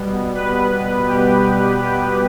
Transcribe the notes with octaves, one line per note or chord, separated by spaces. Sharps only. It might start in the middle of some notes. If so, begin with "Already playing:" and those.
Already playing: B2 G3 B3
B4
G4
G4